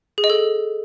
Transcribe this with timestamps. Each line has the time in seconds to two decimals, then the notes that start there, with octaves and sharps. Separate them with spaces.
0.18 G#4
0.24 D#5
0.30 A4